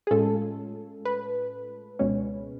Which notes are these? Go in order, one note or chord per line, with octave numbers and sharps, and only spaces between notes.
G#4
A2 G#3 C#4 F4 A4
B4
C#2 B2 G#3 C#4